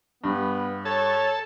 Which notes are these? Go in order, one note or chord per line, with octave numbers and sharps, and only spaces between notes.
G2 B3
A4 C#5